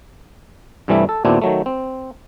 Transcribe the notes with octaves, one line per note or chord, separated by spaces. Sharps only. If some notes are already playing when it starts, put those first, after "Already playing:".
G2 C3 E3 G3 A3 E4
A4
D#2 A#2 B3 C4 D4 E4
D#3 F#3 A3
C4